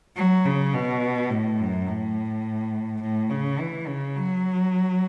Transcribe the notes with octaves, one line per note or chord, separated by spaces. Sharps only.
F#3
C#3
B2
A2
F#2
A2
A2
C#3
E3
C#3
F#3